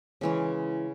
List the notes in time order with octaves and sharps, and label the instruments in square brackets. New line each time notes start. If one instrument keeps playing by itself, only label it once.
[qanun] C#3 E3 G#3 C#4